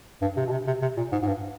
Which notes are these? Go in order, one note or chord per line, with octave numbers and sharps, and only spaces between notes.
G2
C3
B2
C3
C3
C3
A#2
G#2
G#2
G2